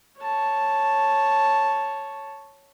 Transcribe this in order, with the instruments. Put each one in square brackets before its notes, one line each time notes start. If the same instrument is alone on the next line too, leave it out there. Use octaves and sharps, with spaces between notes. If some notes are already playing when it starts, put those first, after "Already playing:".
[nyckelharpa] C#5 A5